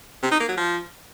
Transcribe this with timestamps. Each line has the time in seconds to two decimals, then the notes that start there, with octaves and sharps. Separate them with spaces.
0.23 C3
0.32 D#4
0.40 A#3
0.49 F#3
0.57 F3